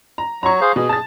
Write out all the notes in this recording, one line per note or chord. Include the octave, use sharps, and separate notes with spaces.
A#5
F#3 A#5 C#6
G#4 C5 F5
B2 G#4
A5 A6